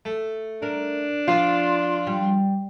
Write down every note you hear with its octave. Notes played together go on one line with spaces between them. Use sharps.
A3
D4 A#4
F3 F4 D5
G3